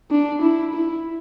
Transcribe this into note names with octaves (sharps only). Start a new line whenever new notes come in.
D4
E4
E4